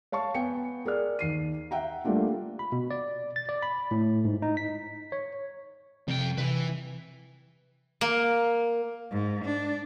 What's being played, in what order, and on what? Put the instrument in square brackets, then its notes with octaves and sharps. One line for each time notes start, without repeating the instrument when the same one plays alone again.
[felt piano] C#5 F5 A5 C#6
B3 G5 G#5 C#7
G#4 A#4 D5 F6
D#2 C7 D#7
E5 F#5 G5 A#5
G3 A3 A#3 D4 F4
[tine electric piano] B5
B2
D5
A6
D5
B5
A2
G#2
D#4
B6
C#5
[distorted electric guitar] F2 G5 [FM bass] C3
[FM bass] C3 [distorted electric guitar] E3 B4
[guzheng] A#3
[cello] G#2
D4